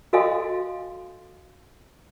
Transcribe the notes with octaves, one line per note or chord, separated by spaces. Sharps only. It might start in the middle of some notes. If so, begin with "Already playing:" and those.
F#4 A4 D#5 F5 G#5 C6